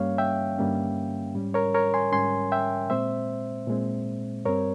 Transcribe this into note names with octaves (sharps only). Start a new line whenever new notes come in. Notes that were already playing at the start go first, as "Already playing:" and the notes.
Already playing: G2 G3 A#3 C#4 C#5 F5
E5 G5
G2 G3 A#3 C#4
G#2 G3 C#4
A#4 C#5
A#4 C#5
G#5 C6
G#2 G3 C#4 G#5 C6
E5 G5
A#2 G#3 C4 C5 E5
A#2 G#3 C4
G2 G3 C4 A#4 C#5